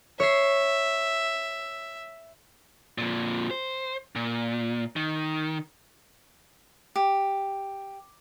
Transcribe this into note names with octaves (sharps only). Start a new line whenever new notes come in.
C#5 E5 C7
F2 A#2
C5
A#2
D#3
G4